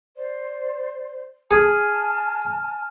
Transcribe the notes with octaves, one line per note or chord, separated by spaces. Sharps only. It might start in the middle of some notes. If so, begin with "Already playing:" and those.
C5 D5
G#4 G#5 A5 F6